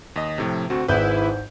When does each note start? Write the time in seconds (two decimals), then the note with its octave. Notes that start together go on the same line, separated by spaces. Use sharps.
0.16 D#2 D#5
0.38 A2 C3 F3
0.70 D2 C4 F#4
0.88 G#1 G#2 E4 G#4 B4 G6